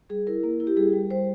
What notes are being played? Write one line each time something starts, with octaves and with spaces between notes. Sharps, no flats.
G3 G#4
E4 A#4
A#3
E4
G4
G3 G#4
G3
G3 C5